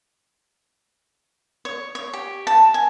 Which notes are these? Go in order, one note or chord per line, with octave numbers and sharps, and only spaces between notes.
C#5
C#5
G4
A5
G#5